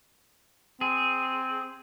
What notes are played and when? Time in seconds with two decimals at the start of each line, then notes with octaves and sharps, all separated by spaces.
0.81 C4 G#4